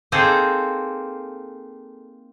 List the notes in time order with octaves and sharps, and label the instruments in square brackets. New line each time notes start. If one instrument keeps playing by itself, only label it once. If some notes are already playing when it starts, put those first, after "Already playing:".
[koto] A#3 C4 D#4 G#4 A4 C5